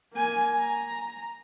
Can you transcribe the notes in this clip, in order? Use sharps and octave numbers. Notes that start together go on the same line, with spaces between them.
A#3 G#5
A#5